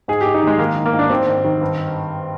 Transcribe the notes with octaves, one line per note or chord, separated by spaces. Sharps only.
G#2 G#4
G#2 G4
D#4
D#3 G#3
D#3 A#3
D#3
A#3
G#2
D4
D#3 C4
G#2
D#3
G2